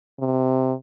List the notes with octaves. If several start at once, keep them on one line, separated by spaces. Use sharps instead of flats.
C3